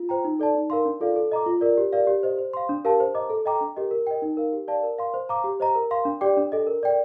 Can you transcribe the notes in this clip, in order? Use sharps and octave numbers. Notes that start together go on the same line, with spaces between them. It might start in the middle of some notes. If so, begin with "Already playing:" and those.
Already playing: F4
C5 G5 A#5
D#4
A4 D5 A5
D#4
A#4 F5 C6
D4
F4 A4 D5 F5
A4
D#5 A#5 D6
F4
A#4 D5
G4
A#4 D5 F5
G4
C5 D#5
C5
F5 C6
D4
G4 A#4 F5 A5
C5
D#5 A#5 D6
A4
D#5 G5 A#5 D6
D4
G4 A#4 D#5
A#4
D#5 G5
D#4
A#4 F5
G4
D5 F5 A5
A#4
F5 C6
C5
F5 A#5 D6
G4
C5 D#5 A#5
A#4
F5 C6
D4
G4 D5 G5 D6
D4
A4 D#5
A#4
D5 G5